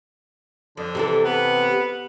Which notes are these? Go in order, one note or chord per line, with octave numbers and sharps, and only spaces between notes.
F2 D3
C3 E3 A4
B3